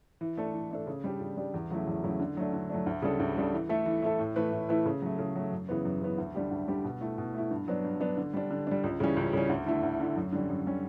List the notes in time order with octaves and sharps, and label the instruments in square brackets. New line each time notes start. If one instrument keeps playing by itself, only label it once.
[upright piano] E3
A3 D4 A4
E3
A3 D4 A4
C#3
G3 D4 G4
C#3
G3 D4 G4
E2
C#3 F#3 A3 E4
E2
C#3 F#3 A3 E4
D3
F#3 A3 D4
D3
F#3 A3 D4
D2
C#3 G3 D4 A4
D2
C#3 G3 D4 A4
E3
A3 E4 A4
E3
A3 E4 A4
A2
E3 A3 E4 B4
A2
E3 A3 E4 B4
C#3
F#3 A3
C#3
F#3 A3
F#2
C#3 E3 B3
F#2
C#3 E3 B3
D2
D3 G3 D4 G4
D2
D3 G3 D4 G4
B2
A3 E4
B2
A3 E4
G2
F#3 B3 D4
G2
F#3 B3 D4
D3
G3 D4
D3
G3 D4
C#2
C#3 E3 G3 C#4
C#2
C#3 E3 G3 C#4
D2
D3 A3 E4
D2
D3 A3 E4
F#2
D3 G3 C#4
F#2
D3 G3 C#4